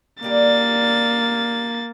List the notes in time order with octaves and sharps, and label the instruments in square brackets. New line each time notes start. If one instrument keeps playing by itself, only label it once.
[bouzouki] D3 G3 D5 [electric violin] A#3 A6